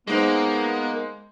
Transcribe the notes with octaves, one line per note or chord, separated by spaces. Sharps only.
G#3 A#3 B3 D#4 C5